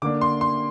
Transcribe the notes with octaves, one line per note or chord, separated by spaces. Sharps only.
D3 A#3 D4 D6
C6
C6